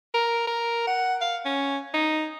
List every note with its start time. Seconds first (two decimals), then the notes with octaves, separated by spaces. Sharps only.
0.14 A#4
0.47 A#4
0.87 F#5
1.21 F5
1.45 C#4
1.94 D#4